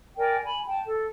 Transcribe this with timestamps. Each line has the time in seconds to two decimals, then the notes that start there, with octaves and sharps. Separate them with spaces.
0.17 A#4 D5 G5 G#5
0.44 G#5 B5
0.68 G5 A5
0.86 A4